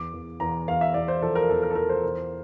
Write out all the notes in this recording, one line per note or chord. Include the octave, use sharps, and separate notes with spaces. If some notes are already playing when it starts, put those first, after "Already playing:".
Already playing: E2 D6
E2
E2 A#5
E2 F5
E5
E2 D5
C5
F3 A4
A#4
E2 A4
A#4
A4
E2 A#4
C5
E3